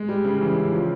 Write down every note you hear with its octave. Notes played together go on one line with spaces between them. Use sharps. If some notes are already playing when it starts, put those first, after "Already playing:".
Already playing: G#3
G3
C#3
E3
C#3
F3